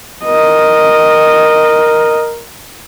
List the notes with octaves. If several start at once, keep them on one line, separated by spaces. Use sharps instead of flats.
A#4 D#5